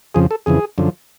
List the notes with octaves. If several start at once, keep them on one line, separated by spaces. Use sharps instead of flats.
F2 C#3 F3 G#4
A4
F2 C#3 E3 G#4
F#2 D3 F3